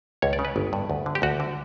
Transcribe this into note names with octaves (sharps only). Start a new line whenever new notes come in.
C#2 C#5
D5
C#3
B4
G1
G2
D2
D3
G4
D2 F#4
D3